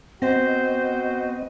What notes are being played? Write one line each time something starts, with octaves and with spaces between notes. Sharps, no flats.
B3 C4 F#4 C5 D#5